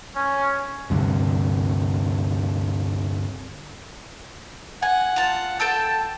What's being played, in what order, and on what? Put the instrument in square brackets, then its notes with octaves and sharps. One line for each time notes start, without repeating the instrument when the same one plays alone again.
[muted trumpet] C#4
[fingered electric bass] D2 G2 C3
[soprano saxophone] F#5 [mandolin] G#5
[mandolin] F4 A5
[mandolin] A4 G5 E6 [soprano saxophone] A5